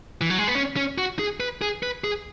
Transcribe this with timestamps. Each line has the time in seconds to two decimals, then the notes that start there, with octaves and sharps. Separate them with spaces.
0.21 E3
0.30 F#3
0.39 G#3
0.47 B3
0.55 C#4
0.76 C#4
0.98 F#4
1.19 G#4
1.40 B4
1.62 G#4
1.83 B4
2.04 G#4